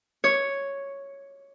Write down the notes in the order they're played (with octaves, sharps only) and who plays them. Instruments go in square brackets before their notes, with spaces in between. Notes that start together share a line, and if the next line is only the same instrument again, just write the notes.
[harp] C#5